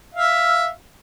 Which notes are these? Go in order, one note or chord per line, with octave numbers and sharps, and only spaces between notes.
E5 F5